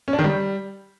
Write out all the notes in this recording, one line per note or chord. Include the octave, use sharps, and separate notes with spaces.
C#4
D4
D#3
G3